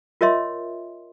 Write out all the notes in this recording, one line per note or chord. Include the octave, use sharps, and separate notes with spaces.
F4 A#4 C#5 D#5 E5 C6